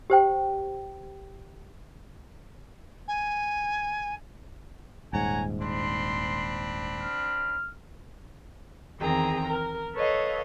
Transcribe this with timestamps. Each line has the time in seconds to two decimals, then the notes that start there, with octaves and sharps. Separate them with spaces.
0.10 G4 C5 G5
3.08 G#5
5.13 D#1 G#2 C#5 F#5 G#5 A#5
5.62 C4 D4 B5 C6
7.02 F6
9.00 E2 D#3 C4 G#4 G5 A#5
9.47 A#4
9.95 A4 B4 C#5 D#5 F5